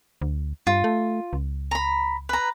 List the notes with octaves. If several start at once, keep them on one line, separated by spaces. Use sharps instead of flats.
D2
G2 F4
A3
C#2
A#5 B5
B4 A#5